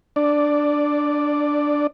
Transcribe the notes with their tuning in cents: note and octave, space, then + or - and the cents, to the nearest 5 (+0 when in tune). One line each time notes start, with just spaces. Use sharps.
D4 +0 D5 +0